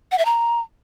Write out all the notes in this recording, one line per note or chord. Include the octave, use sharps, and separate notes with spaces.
F#5
E5
A#5